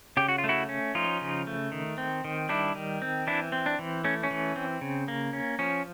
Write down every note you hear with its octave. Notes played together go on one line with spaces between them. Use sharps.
C#3 G4
F#4
F4
A3
E4 F#4
C#4
F3 D#4 F4
C#3
A3
D#3
C4
D#3
G3 D4 E4
D#3
C4
E3 D4 E4
C4
D4
E3
A3 C#4
C#4
E3
C4
C#3
A#3
C#4
F3 C#4